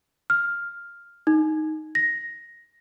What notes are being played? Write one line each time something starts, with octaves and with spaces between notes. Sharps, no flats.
F6
D#4
A#6